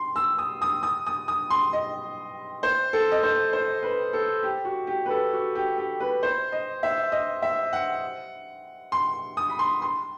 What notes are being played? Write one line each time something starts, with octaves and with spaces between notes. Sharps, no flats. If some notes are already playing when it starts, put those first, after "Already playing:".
Already playing: C6
E6
D#6
D#6
D#6
D#6
D#6
C6
D#5
C5
A4
D#5
C5
C5
B4
A4
G4
F#4
G4
B4
A4
F#4
G4
G4
B4
C5
D#5
E5
D#5
E5
F#5
C6
D#6
B5
C6
C6